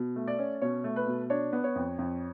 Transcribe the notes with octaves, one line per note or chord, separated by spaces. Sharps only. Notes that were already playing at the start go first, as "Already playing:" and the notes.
Already playing: B2
A3
D5
C#4
B2 C#5
A3
B4
B2
D4 C#5
B3
C#5
F2
F2